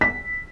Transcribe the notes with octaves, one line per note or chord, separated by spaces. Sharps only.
B6